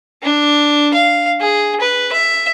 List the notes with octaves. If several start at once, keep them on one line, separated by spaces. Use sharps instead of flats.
D4
F5
G#4
B4
E5